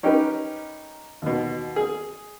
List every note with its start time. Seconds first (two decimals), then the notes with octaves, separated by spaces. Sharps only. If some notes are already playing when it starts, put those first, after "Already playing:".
0.03 C#4 D#4 G4 A#4 B4
1.22 D#2 B2
1.76 G#4